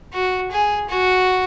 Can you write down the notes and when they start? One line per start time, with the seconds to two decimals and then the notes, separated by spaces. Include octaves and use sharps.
0.13 F#4
0.51 G#4
0.89 F#4